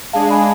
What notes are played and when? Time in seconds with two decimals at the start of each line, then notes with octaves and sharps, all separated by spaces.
0.13 G#3 D4 G#4 F5 A5
0.30 G#5 B5